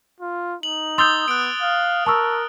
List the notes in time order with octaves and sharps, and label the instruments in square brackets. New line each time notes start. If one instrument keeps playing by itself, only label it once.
[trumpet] F4
[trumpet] D#4 [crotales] F#7
[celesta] C6 E6 G6 [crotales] D#6 A6 G7
[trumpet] B3 [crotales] F#6 D7
[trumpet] F5
[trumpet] A#4 [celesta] A5 C#6 E6